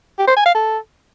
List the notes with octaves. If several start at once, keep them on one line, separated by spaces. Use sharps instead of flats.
G4
C5
G#5
F5
A4